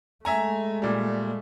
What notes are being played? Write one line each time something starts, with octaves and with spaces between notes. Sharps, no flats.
G#3 A3 E5 G#5 A#5
A#2 G3